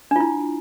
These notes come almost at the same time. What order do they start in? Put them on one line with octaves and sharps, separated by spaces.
D4 F4 E4